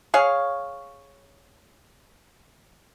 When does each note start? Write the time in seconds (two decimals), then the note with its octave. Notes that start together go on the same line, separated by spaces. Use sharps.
0.14 G#4 C#5 F5